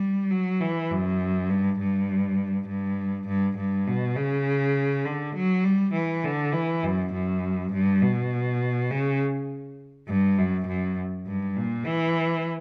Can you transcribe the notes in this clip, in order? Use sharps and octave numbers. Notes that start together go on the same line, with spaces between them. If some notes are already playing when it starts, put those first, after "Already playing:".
Already playing: G3
F#3
E3
F#2
G2
G2
G2
G2
G2
B2
C#3
D3
F#3
G3
E3
D3
E3
F#2
F#2
G2
B2
C#3
G2
F#2
F#2
G2
A#2
E3